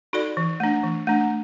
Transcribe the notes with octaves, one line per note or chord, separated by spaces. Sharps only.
D#4 F#4 A4 D5
E3
A3 D4
E3
A3 D4